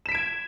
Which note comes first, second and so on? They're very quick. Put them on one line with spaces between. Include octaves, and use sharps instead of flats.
E7 B6 D7 G#6